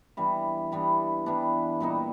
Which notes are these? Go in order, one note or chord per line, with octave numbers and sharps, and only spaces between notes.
E3 G3 B3 D4
E3 G3 B3 D4
E3 G3 B3 D4
A#2 G3 B3 D#4